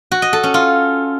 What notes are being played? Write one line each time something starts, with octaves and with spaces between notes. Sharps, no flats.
F#4
D#5
A4
C#4
F4